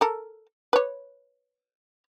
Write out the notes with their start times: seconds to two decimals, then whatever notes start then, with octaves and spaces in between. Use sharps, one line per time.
0.01 A4 A#4
0.73 B4 C#5